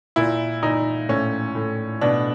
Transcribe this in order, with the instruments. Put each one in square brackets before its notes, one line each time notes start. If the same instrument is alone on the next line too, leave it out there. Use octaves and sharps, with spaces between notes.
[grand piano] A#2 E4
A#2 D#4
A2 C#4
A2
B2 D4